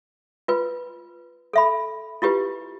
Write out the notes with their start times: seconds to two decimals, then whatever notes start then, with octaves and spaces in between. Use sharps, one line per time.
0.48 F4 B4
1.53 A4 E5 B5
2.22 E4 F4 G4 B4